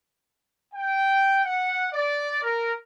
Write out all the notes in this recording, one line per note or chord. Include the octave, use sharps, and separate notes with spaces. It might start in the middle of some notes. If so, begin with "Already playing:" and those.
G5
F#5
D5
A#4